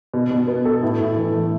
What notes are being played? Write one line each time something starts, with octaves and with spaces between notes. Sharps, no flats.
B2
B2
B3
A4
A2
A2
E3
A3